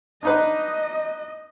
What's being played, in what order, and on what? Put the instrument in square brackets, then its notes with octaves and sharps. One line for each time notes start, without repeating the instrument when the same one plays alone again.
[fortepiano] D4 D#4 B4 [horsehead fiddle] D#5